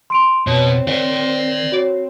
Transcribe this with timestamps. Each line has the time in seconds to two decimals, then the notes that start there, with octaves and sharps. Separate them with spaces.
0.10 C6 D7 F7
0.47 F2 B2 C4 C#5
0.88 D#3 D5 F5
1.72 F#4 C#5